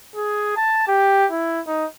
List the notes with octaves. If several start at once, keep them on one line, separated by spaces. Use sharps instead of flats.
G#4
A5
G4
E4
D#4